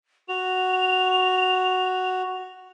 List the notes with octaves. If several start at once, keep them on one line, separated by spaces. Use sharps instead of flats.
F#4 F7